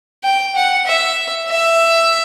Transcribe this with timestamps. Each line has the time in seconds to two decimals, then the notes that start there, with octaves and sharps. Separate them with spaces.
0.24 G5
0.56 F#5
0.86 E5
1.49 E5